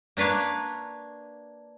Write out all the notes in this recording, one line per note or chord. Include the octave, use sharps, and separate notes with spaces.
A#3 D4 B4 C#5 F5